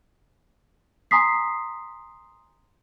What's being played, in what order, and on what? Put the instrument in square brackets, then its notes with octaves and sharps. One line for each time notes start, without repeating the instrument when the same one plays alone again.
[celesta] G#5 A#5 C6 D#6 B6 C7